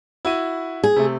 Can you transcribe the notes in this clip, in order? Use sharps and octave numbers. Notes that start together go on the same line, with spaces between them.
E4 F#4 D#7
G#4
C3 A3